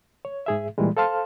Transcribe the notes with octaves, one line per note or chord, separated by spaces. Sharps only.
C#5
G#2 G#4 E5
A#2 E3 G3 G#3
A4 C5 F5 A5 C6 F6